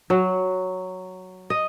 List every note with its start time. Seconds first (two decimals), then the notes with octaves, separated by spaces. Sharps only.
0.10 F#3
1.50 D#5